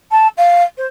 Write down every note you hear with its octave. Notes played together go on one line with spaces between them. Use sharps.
A5
F5
C5